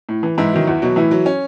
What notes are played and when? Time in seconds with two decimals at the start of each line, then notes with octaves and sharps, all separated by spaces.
0.09 A2
0.23 E3
0.38 G#2 E3 E4
0.53 D#3 F#3
0.68 E2
0.82 B2 F#3
0.96 A2 E3 E4
1.11 F#3
1.26 C#4